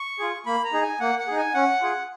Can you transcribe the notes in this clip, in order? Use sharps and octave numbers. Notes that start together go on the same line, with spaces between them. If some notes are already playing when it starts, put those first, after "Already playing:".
Already playing: C#6
F4 G#4
A#3 B5
A#5
D#4 G#4
G#5
A#3 F#5
F#5
D#4 G#4
G#5
C#4 F#5
F4 G#4